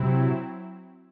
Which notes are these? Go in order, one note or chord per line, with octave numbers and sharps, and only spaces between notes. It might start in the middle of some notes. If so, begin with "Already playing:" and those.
Already playing: C3 F#3 C4 E4